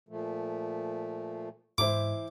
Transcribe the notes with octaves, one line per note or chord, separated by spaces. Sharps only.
A#2 F3 A3
G#2 E3 E4 C5 D6